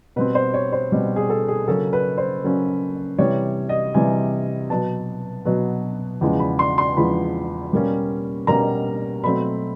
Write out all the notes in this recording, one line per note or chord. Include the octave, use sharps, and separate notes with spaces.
B2 G3 C4 B4
C5
C#5
C5
B2 G3 C4
G#4
A4
G#4
C#3 F#3 A#3 C#4 A4
B4
C5
C#3 F#3 A#3 C#4
C3 E3 G3 C#5
D#5
C3 E3 G3 G#5
B2 F#3 B3 A5
B2 F#3 B3
E2 C#3 F3 G#3
B5
C6
C6
E2 C#3 F3 G#3 B5
B2 G3 A#3 C#4
B2 G3 A#3 C#4 A#5
B2 F#3 A3 C4 B5